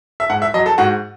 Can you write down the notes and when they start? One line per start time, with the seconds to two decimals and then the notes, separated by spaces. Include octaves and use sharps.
0.20 E5
0.30 G#2 F#5
0.42 E5
0.54 F#3 D#5
0.66 A4
0.78 G#2 F#4